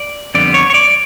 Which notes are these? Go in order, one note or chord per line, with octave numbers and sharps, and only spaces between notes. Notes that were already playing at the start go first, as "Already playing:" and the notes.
Already playing: D5
F2 D3 G3 B3 D5
C#5
C#5
D5